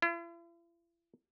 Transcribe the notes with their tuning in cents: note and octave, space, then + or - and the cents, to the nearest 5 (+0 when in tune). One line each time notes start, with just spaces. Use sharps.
E4 +45